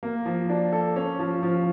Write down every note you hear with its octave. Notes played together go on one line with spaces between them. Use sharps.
A#3
F3
D4
A4
C#4
F3
F3